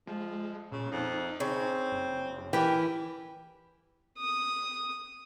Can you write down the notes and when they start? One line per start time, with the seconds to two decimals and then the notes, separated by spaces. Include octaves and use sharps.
0.07 F3 G#3
0.72 A#2 C#3
0.92 F2 D#4
1.40 C#3 C4
1.92 F#1
2.53 E3 G4 A#4 G5
4.18 D#6